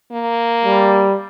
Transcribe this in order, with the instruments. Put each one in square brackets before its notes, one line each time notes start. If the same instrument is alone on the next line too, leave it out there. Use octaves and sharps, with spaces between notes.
[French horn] A#3
[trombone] G3